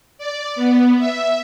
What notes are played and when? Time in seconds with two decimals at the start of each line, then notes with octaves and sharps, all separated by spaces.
0.18 D5
0.56 B3
0.99 E5